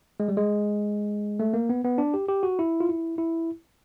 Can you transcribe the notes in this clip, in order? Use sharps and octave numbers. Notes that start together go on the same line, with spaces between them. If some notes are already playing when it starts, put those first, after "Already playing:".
G#3
G3
G#3
A3
A#3
B3
B3
D4
G4
G4
F#4
E4
F4
E4
E4